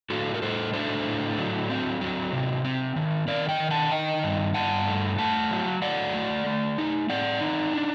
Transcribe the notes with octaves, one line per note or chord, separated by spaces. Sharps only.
A2 F#4 A4
A#4
A2 A4 C5
D4 A4 C5
A2
F#3
C4
F#3
C3
C4
D#3
D#3 A#4 D5
D#5 G5
D#3
F#5 A5
D#3 D#5 G5
G2
G2 F#5 A5
A3
A3 F#5 A5
F#3
F#3 D5 F#5
A3
A3
D#4
C4 D5 F#5
D#4
D4